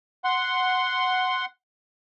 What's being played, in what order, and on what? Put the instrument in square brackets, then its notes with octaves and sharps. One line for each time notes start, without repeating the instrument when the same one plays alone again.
[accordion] F#5 C6